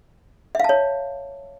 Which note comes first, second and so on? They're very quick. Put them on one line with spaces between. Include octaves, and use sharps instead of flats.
E5 F5 A5 C#5